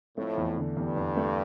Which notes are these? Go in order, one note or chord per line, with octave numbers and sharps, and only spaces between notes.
F2 A2 A3
E2
D3
E2 G2
E2
A3